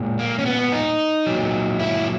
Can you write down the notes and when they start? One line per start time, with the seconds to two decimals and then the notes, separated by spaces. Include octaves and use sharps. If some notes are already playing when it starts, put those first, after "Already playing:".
Already playing: A#2 G#3
0.19 A#3
0.39 C#4
0.46 B3
0.72 D#4
1.26 A#2 F#3
1.80 E4